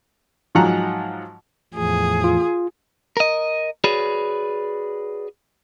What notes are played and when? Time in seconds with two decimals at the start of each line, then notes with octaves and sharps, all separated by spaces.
0.55 G#2 F3 F#3 F#5 A#5
1.74 E2 A2 F3 G#4
2.24 F4
3.17 A#4 D#5
3.84 F#4 G#4 B4 C#5 D5